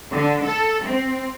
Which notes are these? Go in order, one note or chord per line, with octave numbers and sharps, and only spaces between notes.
D3
A4
C4